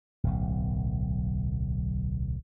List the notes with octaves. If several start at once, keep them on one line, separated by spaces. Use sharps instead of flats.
D1 B1